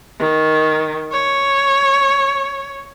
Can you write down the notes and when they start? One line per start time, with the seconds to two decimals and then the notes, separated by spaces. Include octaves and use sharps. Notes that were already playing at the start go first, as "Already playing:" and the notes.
0.20 D#3
1.12 C#5